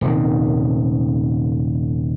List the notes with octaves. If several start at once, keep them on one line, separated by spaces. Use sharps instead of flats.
D#1 C3 D#3